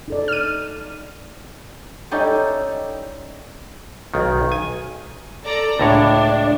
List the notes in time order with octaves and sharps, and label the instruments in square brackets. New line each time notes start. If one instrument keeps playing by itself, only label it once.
[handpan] D#4 A4 D5
[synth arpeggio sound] F6 D#7
[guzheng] G3 C#4 D#4 E4 G4 A4
[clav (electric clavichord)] B1 D#3
G#5
[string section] A4 D5 A#5
[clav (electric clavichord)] C#2 A2 C#5 [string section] D4